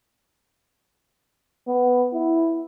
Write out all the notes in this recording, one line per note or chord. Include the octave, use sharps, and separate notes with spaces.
B3
E4